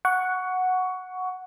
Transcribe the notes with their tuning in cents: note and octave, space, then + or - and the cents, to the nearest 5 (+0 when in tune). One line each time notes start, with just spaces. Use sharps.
F#5 -5 C#6 +15